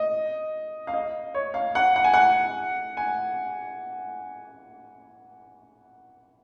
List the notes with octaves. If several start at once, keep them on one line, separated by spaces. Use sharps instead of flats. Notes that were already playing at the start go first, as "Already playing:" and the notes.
Already playing: D#5
F5
D#5
C#5
F5
F#5
F#5
G#5
F#5
G#5